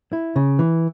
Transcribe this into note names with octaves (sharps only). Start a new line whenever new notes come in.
E4
C#3
E3